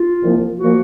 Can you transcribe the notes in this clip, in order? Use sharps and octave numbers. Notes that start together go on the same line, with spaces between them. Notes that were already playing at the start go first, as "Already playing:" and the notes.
Already playing: F4
C2 A#2 F3 A#3
A#2 F3 A#3 F#4